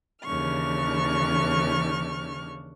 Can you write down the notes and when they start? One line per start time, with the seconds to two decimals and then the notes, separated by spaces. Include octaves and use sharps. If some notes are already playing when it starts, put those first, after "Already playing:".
0.23 D#2 C#3 E3 D4 C#6 F6